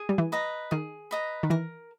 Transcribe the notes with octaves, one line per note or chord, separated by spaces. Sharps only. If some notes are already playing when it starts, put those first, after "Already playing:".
Already playing: G#4
G3
E3
B4 D#5 A#5
D#3 G#4
B4 D#5 A#5
D#3
E3 A#4